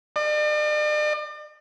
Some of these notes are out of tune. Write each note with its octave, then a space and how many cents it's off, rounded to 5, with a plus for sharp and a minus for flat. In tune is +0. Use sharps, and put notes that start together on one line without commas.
D5 +45